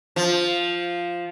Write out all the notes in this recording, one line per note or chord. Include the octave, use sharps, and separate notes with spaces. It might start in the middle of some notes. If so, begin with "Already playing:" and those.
F3